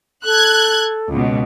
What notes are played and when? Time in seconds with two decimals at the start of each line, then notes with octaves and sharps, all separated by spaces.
0.25 A4 F#6 G#6
1.09 C#2 B2